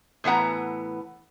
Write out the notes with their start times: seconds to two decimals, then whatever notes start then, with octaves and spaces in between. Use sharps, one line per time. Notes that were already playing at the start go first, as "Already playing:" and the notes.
0.24 A2 E3 B3 F#5 A#5